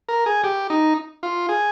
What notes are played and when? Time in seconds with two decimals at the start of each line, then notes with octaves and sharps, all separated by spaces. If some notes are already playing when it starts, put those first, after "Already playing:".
0.09 A#4
0.26 G#4
0.44 G4
0.70 D#4
1.23 F4
1.49 G#4